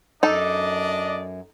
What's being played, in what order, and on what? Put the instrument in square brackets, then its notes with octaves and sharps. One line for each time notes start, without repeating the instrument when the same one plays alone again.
[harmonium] F#2 [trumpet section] D4 D5 D#5 [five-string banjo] D#4 A4